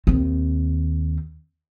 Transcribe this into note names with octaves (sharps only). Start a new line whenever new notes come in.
D#2 C4